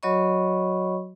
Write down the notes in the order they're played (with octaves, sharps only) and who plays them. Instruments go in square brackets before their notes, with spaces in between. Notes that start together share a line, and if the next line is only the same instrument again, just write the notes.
[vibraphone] F#3 F#4 C#5 D#5 B5 C#6